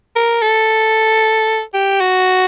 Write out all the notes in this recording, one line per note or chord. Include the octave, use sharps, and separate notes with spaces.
A#4
A4
G4
F#4